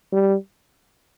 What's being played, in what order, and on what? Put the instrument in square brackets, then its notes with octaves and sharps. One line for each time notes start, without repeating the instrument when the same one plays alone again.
[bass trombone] G3